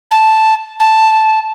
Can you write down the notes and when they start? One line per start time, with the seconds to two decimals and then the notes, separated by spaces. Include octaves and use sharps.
0.11 A5
0.79 A5